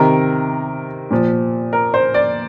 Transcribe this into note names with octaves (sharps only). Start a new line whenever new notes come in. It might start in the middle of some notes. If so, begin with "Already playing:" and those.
Already playing: C3 D#3 A#4
A#2 F3
A#4
C5
D5